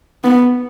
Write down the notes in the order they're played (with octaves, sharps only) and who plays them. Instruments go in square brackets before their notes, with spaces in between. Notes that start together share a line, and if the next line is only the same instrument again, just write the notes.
[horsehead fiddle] B3